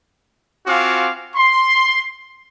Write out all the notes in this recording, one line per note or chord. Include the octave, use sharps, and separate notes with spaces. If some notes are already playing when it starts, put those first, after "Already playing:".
C4 F4 F#4 F5 G#5 D6
C6